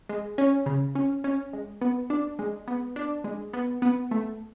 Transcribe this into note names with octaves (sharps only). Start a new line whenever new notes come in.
G#3
C#4
C#3
C#4
C#4
G#3
B3
D4
G#3
B3
D4
G#3
B3
B3
A3